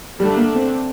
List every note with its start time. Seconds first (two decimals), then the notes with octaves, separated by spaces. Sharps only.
0.19 D3 G3 A3 D4
0.36 A#3
0.55 C4